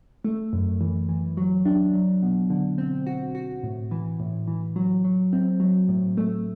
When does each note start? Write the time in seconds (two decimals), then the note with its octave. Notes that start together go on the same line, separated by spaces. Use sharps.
0.24 A3
0.53 F#2
0.81 E3
1.09 E3
1.37 F#3
1.66 D4
1.94 F#3
2.22 B2
2.50 D3
2.78 C4
3.07 F#4
3.35 F#4
3.63 A2
3.91 E3
4.20 A2
4.47 E3
4.76 F#3
5.04 F#3
5.33 C4
5.60 F#3
5.88 A2
6.17 A3